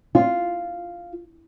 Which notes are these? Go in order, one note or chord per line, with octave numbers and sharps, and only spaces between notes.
F4